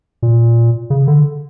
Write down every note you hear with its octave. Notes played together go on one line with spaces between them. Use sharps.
A#2
C#3
D3